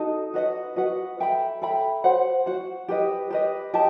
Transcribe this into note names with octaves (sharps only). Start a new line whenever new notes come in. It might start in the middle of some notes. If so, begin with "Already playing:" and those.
Already playing: D#4 F#4 A4 D#5
F#4 B4 D#5 F#5
F#4 B4 D#5 F#5
A4 E5 G5 B5
A4 E5 G5 B5
F#4 C5 F#5
F#4 C5 F#5
G4 B4 D#5
G4 B4 D#5
G4 D#5 A5